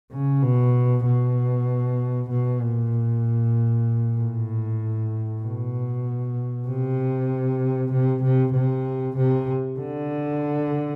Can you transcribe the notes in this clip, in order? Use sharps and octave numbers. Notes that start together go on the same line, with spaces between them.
C#3
B2
B2
B2
A#2
A2
B2
C3
C3
C3
C3
C3
D3